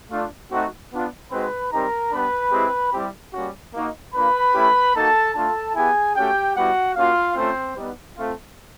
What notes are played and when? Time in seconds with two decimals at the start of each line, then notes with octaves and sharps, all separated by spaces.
0.10 A3 D4 F4
0.51 A3 C4 D#4 F#4
0.92 B3 D4 F4
1.32 G#3 C4 D#4 F#4 B4 B5
1.72 G3 C4 D#4 G4 A#4 A#5
2.12 G3 B3 D4 B4 B5
2.52 G#3 C4 E4 G4
2.92 G3 C4 E4 G4
3.34 G3 A#3 C#4 F#4
3.74 A#3 D#4 F#4
4.14 A#3 D4 F4 B4 B5
4.54 A3 C#4 E4 G4
4.94 A#3 D#4 F#4 A4 A5
5.34 A3 D4 F4 A4 A5
5.75 B3 E4 G4 G#4 G#5
6.16 A3 C#4 F#4 G4 G5
6.56 G3 B3 E4 F#4 G4 F#5
6.96 A#3 C#4 F4 F#4 F5
7.36 A3 C4 C#4 F4 C5
7.77 G3 B3 D#4
8.17 A3 C4 F4